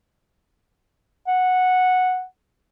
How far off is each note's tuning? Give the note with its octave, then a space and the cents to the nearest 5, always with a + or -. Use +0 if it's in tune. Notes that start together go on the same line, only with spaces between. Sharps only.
F#5 -10